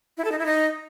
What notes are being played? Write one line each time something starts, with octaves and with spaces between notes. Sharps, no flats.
E4
A4
D#4
E4
D#4